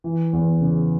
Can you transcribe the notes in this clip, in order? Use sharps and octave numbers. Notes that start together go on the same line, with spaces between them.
E3
E2
C#3